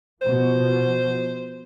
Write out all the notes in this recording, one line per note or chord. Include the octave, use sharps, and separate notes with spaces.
B2 F3 C5